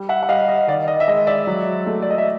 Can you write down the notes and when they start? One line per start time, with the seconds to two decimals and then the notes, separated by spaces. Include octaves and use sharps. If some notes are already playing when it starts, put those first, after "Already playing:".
Already playing: G3
0.09 E5 F#5
0.23 F#5
0.29 G3 D#5 F5
0.48 D#5
0.67 D#3 D5
0.88 D#5
1.00 E5
1.07 G#3 D#5
1.27 D5 E5
1.47 F#3
1.86 A3
2.02 D5
2.10 D#5
2.18 E5